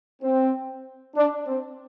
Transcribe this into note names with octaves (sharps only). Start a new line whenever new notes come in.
C4
D4
C4